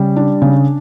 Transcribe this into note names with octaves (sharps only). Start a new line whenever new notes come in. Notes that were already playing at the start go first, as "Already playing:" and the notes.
Already playing: C#3 G3
D4
C#3